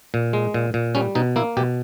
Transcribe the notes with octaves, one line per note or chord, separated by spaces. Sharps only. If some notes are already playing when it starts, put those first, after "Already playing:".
A#2
G#3
A#2
A#2
G3 C#4
B2 D#4
A#3 E4
B2 G4